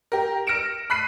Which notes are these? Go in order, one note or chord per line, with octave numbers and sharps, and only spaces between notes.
G4 A#4
F6 A#6 C#7 D7 E7
B5 F#6 B6 C7 D#7